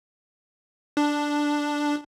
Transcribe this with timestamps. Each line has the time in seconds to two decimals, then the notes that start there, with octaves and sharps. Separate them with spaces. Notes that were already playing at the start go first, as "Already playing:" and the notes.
0.97 D4